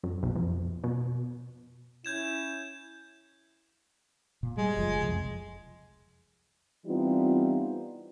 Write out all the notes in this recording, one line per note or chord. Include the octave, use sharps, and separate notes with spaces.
F#2
B1
F2
B2
C#4 E4 G6 G#6 E7
A#2
G3 G#3
F#1 F3
C2 F2
E3 G3 B3 C4 D#4 F4